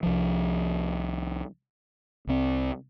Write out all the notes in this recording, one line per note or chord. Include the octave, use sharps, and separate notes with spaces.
C2 F3
C2 C4